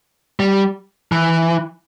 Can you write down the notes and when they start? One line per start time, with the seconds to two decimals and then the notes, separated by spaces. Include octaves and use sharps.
0.40 G3
1.12 E3